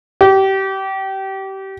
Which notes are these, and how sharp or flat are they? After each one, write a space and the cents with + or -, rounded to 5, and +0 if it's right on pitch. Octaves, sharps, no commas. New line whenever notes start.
G4 -25